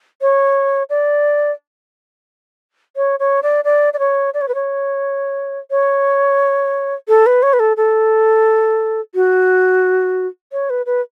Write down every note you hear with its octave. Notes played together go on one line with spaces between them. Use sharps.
C#5
D5
C#5
C#5
D5
D5
D5
C#5
D5
C#5
B4
C#5
C#5
A4
B4
C#5
B4
A4
A4
F#4
C#5
B4
B4